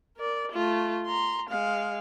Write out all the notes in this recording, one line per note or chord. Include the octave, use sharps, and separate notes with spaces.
A#4 D5
A3 F4
A#5 C6
G#3 F5